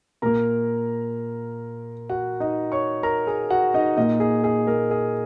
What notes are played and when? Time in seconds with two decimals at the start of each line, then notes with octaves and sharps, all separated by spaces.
0.22 A#2 A#3 A#4 A#5
2.10 F#4 F#5
2.40 D#4 D#5
2.72 C#5 C#6
3.03 A#4 A#5
3.27 G#4 G#5
3.51 F#4 F#5
3.74 D#4 D#5
3.97 A#2 A#3 D#4 D#5
4.20 G#4
4.44 G#4
4.67 A#3 A#4
4.91 G#4